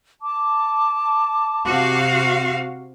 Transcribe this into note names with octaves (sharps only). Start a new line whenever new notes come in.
A5 D6
C3 F#4 F5